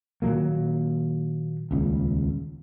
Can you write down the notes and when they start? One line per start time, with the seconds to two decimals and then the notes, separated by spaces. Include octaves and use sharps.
0.22 A#2 D#3 F#3 A#3
1.71 D#1 C#2